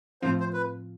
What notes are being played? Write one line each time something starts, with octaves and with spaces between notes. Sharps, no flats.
A2 F3 C4 F4 C5
C5
B4